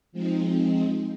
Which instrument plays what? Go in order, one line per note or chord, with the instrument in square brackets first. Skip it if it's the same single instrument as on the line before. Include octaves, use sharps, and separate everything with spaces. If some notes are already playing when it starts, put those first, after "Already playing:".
[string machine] F3 G#3 C4 D#4